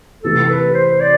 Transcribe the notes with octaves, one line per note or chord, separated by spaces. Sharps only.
C3 E3 A3 A4
B4
C5
D5